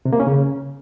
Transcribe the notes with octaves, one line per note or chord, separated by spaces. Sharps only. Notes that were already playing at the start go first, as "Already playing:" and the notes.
C3
A#3
C#4
C#3